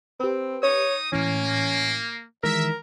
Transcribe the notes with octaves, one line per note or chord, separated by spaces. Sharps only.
C4 G4 B4
D#4 C#5 D#6
A2 E3 A#3 C#4
D#3 E3 G#3 A#4 E5